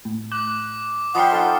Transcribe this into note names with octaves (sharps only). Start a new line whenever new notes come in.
A2
D6 F#6
F3 D#5 F#5 G5 B5 C6 D#6 F6
D#4 F4 A4